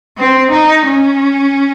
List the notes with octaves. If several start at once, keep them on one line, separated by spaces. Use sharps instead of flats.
C4
D#4
C#4